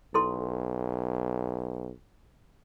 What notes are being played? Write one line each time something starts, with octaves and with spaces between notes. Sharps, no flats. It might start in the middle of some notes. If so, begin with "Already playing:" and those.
B1 E4 A4 C6